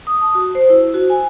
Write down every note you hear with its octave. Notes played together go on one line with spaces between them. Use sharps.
D#6
A5
F#4
C5
E4
F#4
G#5